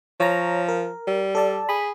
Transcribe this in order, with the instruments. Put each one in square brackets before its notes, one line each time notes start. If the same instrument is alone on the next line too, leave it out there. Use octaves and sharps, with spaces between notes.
[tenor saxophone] F3 [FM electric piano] C#5 A#5
[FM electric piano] A#4
[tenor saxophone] G3
[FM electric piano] A4 D5 A5
[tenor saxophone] G#4 [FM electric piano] B5